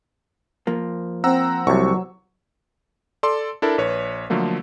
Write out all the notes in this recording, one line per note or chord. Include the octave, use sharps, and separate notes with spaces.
F3 A#3
C4 F#5 A#5 E6
C2 C3 F#3 C#6
A4 D5 C6
D4 E4 A4 A#4
A#1 B4 C#5
D3 F3 F#3 A3 A#3